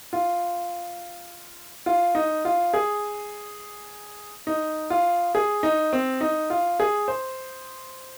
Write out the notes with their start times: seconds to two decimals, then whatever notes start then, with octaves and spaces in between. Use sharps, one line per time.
0.13 F4
1.86 F4
2.15 D#4
2.45 F4
2.74 G#4
4.47 D#4
4.90 F4
5.35 G#4
5.63 D#4
5.93 C4
6.21 D#4
6.50 F4
6.80 G#4
7.08 C5